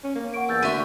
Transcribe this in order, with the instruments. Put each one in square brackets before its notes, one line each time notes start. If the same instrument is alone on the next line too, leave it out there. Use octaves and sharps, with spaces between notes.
[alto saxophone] C#4
A#3
[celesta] F#5 C#6 D7
[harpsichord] E2 [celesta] E6 G6 A6
[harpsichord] D2 F#4 C6 [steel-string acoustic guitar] D3 E5 [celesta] C#6 B6 D#7